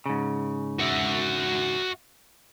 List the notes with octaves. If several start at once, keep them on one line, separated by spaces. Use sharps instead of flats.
G#2 C#3
F#4 E5